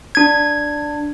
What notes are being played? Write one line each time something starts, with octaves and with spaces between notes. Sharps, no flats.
D4 G#6